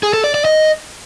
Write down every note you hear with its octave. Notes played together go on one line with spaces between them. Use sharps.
G#4
A4
D5
D5
D#5